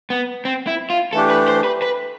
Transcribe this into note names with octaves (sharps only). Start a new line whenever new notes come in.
B3
C4
E4
F4
E3 A3 D4 G4 A4
B4
C5
B4
B4